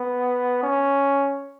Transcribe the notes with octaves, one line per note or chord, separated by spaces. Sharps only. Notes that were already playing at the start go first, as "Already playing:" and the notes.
Already playing: B3
C#4